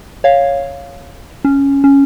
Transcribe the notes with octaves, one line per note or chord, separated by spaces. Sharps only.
C#5 F5
C#4
C#4